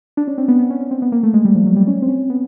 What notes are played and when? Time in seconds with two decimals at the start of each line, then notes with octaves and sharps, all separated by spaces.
0.17 D4
0.28 C#4
0.38 C4
0.48 B3
0.59 B3
0.70 C#4
0.81 C#4
0.91 C4
1.02 B3
1.12 A#3
1.23 A3
1.34 G#3
1.45 G3
1.55 F3
1.66 F#3
1.76 G3
1.87 C#4
2.02 C4
2.09 C#4
2.30 B3